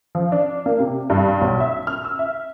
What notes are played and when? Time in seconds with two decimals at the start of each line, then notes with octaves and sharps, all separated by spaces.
0.15 F3
0.32 D4
0.66 A#3
0.79 C3
1.10 G2
1.41 B1
1.60 E5
1.87 F6
2.04 E6
2.19 E5